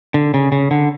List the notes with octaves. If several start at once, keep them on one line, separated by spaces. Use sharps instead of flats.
D3
C#3
C#3
D3